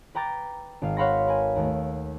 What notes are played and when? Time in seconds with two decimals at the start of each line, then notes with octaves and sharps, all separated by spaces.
0.15 B4 G5 A#5 D6 A6
0.82 G#1 F5
0.97 C#5 F5 F#5 B5 C6 A#6
1.27 A#4 B4 G#5
1.56 D#2 A3